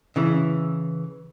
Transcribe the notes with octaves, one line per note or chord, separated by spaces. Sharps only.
C#3 E3